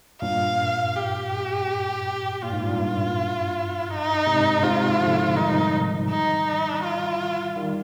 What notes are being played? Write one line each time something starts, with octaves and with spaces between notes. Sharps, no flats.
G2 A#2 F5
G4
A#2 F4
G#2
G2 A#2
G2
D#4
G#2 C3
G#2 C3 F4
D3 F3
D#3 G3 D#4
D#4
F4
D#3 G3